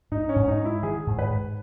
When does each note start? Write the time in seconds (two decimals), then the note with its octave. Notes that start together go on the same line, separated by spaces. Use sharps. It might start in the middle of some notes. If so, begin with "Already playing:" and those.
0.12 G#2 D#4
0.29 C#4
0.36 G#2
0.48 D#4
0.59 G#3
0.65 E4
0.83 D#3 G#4
1.07 G#2
1.19 B4
1.30 G#2